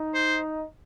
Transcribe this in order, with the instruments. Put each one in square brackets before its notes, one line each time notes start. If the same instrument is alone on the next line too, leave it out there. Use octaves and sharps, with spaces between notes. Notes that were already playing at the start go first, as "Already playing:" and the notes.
Already playing: [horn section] D#4
[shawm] C5